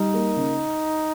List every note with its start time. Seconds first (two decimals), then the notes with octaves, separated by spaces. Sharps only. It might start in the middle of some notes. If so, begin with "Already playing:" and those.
Already playing: G3 D#4
0.14 A#3
0.36 C#3